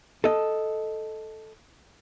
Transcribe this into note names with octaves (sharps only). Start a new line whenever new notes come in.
A4 D#5